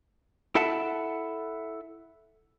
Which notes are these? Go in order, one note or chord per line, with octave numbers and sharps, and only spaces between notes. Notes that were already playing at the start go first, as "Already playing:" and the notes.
E4 A4 E5 F#5 A5